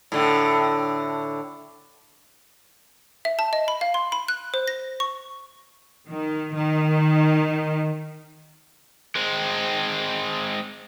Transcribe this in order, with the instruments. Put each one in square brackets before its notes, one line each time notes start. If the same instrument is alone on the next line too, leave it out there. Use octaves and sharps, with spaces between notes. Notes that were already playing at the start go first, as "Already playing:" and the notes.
[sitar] A2 D3
[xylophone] E5
A5
D#5
B5
F5
C6
B5
F#6
C5
A#6
C#6
[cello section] D#3
D#3
[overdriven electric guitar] G#3 C4